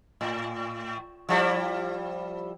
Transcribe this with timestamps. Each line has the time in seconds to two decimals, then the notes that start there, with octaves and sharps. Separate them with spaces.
0.21 A2
1.29 F3 G3 E4